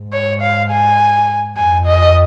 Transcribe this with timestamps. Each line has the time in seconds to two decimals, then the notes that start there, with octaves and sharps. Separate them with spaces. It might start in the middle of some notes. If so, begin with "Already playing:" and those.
Already playing: G#2
0.13 C#5
0.42 F5
0.71 G#5
1.57 F2 G#5
1.86 D#5